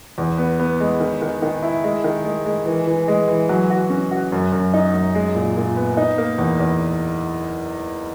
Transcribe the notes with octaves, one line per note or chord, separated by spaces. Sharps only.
E2
B3
B3
G#3
D#3
D#3
D#3
E4
G#3
D#3
G#3
G#3
E3
E3
G#3
E3
F#3
F#4
C#4
F#4
F#2
F#2
D#4
F#2
G#3
A#2
A#2
B3
D#4
A#3
E2
E2